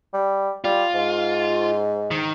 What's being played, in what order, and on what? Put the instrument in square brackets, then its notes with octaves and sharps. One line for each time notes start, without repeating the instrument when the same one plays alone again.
[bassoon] G3
[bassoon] G3 [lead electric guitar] F4
[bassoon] G#2
[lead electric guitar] D#3